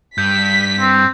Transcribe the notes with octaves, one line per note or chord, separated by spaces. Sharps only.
G2 G6 B6
C4